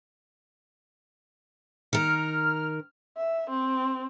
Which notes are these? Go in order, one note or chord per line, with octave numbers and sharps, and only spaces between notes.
D#3 A#4 F6
E5
C4